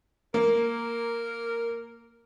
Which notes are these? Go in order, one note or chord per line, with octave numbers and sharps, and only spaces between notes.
A#3 A#4